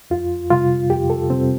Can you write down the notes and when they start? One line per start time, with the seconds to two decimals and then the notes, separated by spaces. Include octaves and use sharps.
0.10 F2 F4
0.50 C3 G3 F4
0.90 F2 G4
1.10 A4
1.30 C3 G3 C4